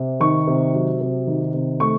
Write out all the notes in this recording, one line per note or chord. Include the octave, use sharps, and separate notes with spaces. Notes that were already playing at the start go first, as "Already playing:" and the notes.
Already playing: C3
D#3 C#6
C3
F#3
C3
D#3
C3
A3 C#6